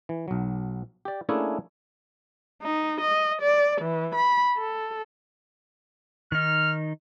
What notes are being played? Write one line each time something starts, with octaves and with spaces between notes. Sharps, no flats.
E3
B1 F#3
G4 D5
A3 A#3 C#4 D4 E4 G#4
D#4
D#5
D5
E3
B5
A4
D#3 D#4 F6